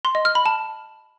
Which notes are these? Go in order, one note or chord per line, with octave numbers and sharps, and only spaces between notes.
C6
D#5
F6
B5
A5